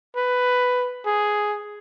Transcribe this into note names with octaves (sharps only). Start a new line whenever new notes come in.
B4
G#4